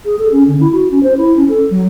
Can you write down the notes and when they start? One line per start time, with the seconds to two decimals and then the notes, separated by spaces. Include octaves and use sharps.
0.05 G#4
0.19 A4
0.32 C#4
0.48 D3
0.60 E4
0.73 F#4
0.91 C#4
1.03 C5
1.17 E4
1.37 C#4
1.49 A4
1.70 F#3